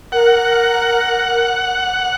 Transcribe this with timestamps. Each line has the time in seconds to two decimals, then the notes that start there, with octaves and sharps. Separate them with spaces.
0.12 A#4 F#5